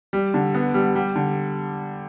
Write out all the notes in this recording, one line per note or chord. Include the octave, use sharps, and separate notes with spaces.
G3
D3
B3
G3
G3
D3